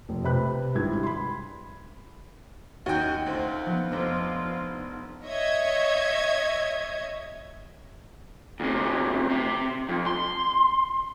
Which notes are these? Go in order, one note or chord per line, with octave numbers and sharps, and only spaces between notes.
F1
C3 B4 B5 F#6
G#1 G2 E4 G#6
B5 C6
D#2 C#4 D#4 F#4 G5
D2 C4 F4
F3 B3
F1 B3 C4 D4 D#4
C#5 D#5 E5 G#6
D2 C3
C3
F2
C6